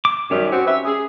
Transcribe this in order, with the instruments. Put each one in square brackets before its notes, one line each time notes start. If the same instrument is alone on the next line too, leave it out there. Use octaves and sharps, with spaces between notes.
[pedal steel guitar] D6
[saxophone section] F#2 D#3 G3 [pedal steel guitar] C#4 G4
[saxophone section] C4 F#4
B4 E5
G#4